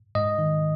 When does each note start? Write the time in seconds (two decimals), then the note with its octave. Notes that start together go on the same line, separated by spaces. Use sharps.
0.15 G#2 D#5
0.39 D#3